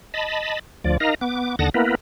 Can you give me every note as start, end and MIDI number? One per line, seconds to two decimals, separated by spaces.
0.14 0.59 75
0.14 0.59 81
0.14 0.59 83
0.84 0.97 38
0.84 0.97 53
0.84 0.97 74
1.00 1.15 63
1.00 1.15 70
1.00 1.15 75
1.00 1.15 77
1.00 1.15 82
1.21 1.56 59
1.21 1.56 86
1.59 1.69 39
1.59 1.69 50
1.59 1.69 78
1.59 1.69 81
1.59 1.69 87
1.59 1.69 94
1.74 1.95 58
1.74 1.95 59
1.74 1.95 64
1.74 1.95 70
1.74 1.95 71